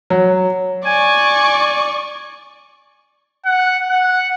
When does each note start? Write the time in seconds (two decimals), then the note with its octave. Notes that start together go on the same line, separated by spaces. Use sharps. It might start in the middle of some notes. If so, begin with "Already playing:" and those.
0.10 F#3
0.85 D5 G#5 C#6
3.45 F#5
3.90 F#5